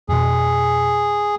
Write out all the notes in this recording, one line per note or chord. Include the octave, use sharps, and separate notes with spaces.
F2 B2 G#4